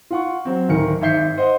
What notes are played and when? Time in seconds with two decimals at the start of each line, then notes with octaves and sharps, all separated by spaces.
0.11 F4 F#5 C#6
0.45 F#3 C4
0.69 D1 D#3 A#4 C#7
1.01 G#1 G#2 E5 G6 C7 C#7
1.38 C5 D#5 F#5